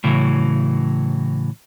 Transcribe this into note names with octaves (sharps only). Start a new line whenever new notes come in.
A2 C#3 E3 F#3